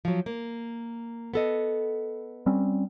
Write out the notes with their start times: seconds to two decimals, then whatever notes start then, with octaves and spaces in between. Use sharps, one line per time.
0.05 F3 F#3
0.26 A#3
1.34 B3 A4 D#5
2.46 G3 C4 C#4